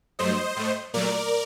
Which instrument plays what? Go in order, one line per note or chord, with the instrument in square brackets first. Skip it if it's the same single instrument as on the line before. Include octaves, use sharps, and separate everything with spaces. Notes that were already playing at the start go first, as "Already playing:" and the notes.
[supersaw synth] G2 F#3 A3 C5 D#5
A2 A3
A#2 F#3 A3 A#4 D5